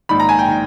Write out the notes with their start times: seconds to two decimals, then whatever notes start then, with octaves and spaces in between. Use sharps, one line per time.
0.09 A#1 G#2 D#3 B5
0.20 A#5
0.29 G#5
0.39 G5
0.48 D#3